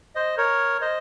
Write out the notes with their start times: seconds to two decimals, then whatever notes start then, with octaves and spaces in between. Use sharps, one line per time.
0.15 C5 D#5
0.38 A#4 C#5
0.81 C5 D#5